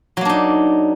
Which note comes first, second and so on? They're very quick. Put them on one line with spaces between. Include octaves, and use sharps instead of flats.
F#3 A#3 D4 D#4